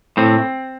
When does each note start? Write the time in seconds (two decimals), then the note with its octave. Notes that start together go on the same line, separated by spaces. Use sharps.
0.17 A2 C4